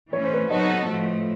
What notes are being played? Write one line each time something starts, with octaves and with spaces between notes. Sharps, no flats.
E3 A3 C#4 C#5
C5
B4 C#5
F#3 B3 D#4 F#4 A4 C#5 D#5
A2 F3 A3